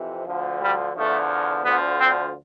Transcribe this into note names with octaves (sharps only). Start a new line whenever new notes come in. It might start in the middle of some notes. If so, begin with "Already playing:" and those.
Already playing: F2 C3 E3
D2 D3 F3
G3
E2 D3 F3 A3
D2 D3 F3 B3
C4